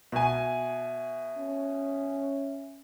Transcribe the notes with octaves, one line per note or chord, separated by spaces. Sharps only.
B2 E5 G#5
C#4